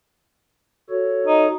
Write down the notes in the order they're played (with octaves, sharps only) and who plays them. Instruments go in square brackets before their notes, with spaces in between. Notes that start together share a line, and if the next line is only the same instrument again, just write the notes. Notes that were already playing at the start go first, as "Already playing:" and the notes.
[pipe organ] F#4 A4 C#5
[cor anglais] D#4